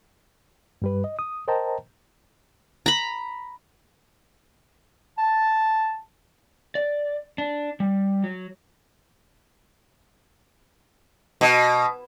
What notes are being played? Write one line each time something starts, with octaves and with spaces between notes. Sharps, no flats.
G2 G3 B4
D#5
D#6
A#4 C5 D#5 G5 A5 A#5
A#5 B5
A5
D5
D4
G3
F#3
B2